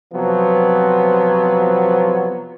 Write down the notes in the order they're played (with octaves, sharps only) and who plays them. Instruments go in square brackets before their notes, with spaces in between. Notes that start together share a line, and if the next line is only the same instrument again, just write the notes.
[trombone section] C3 F3 F#3 B3